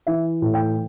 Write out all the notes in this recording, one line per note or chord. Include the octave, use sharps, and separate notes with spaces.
E3 E5
A2
G5